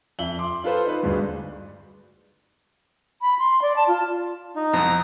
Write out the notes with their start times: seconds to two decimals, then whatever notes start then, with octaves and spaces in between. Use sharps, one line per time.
0.19 F2 E5 F#7 G7
0.39 C6 D6
0.64 F4 A4 B4 C5
0.85 D#4 B4
1.03 D2 G2 G#3
3.22 B5
3.39 C6
3.62 D5
3.76 A5
3.88 F4
4.56 D#4
4.73 C2 F2 A#5